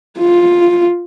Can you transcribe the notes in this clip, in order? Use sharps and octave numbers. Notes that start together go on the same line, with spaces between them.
F4